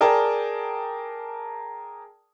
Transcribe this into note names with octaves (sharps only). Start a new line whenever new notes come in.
G#4 A#4 D5 G5 A5